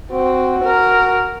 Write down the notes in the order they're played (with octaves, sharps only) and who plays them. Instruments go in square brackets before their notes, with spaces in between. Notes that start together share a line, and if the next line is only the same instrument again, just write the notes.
[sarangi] C4 [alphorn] F#4
[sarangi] A#4